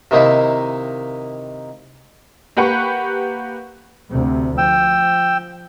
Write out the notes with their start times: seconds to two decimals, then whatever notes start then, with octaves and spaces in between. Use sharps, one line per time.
0.11 C3 D#3 A#3 D#4 E4
2.57 A#3 G4 B4 F#5 B5 C#6
4.10 D2 C3
4.58 F3 G5 E6